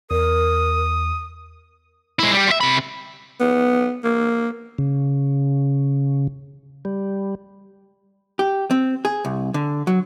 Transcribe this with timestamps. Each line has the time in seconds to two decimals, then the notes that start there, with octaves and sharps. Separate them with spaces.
0.11 E2 A#4 D#6
2.19 G#3 E4
2.33 G3 G4
2.48 F4 E5
2.61 C3 B5
3.40 B3
4.04 A#3
4.78 C#3
6.85 G3
8.39 G4
8.71 C4
9.05 G#4
9.25 C2
9.54 D3
9.87 F#3